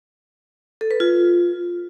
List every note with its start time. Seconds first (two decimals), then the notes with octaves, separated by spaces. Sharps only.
0.81 A4
0.91 B4
1.00 F4